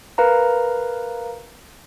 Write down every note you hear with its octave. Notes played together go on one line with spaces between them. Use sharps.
A#4 B4 F5 A#5